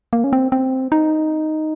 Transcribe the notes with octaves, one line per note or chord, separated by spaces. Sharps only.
A#3
C#4
C4
C4
D#4